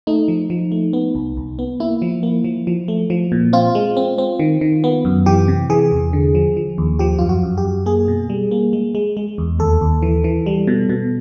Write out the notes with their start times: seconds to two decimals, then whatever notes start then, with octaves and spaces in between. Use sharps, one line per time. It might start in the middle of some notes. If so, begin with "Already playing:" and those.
0.07 A3 D#4
0.28 F3
0.50 F3
0.72 A3
0.93 B3
1.15 C2
1.37 C2
1.59 B3
1.80 A#3 E4
2.02 F3
2.23 A#3
2.44 F3
2.67 F3
2.88 A3
3.10 F3
3.32 A#2
3.53 C4 F4
3.75 G#3
3.97 C4
4.18 C4
4.39 D#3
4.61 D#3
4.84 B3
5.05 F#2
5.26 E3 G4
5.48 C3
5.70 E3 G#4
5.92 E2
6.13 D3
6.35 F3
6.57 F3
6.78 D#2
6.99 F3 G4
7.19 F#2 F4
7.29 F#4
7.43 F#2
7.58 G4
7.65 F#2
7.86 A#3 G#4
8.08 B2
8.30 G3
8.51 A#3
8.73 G#3
8.95 G#3
9.17 G#3
9.38 E2
9.59 D#2 A4
9.81 D#2
10.02 E3
10.24 E3
10.46 G3
10.67 B2
10.89 B2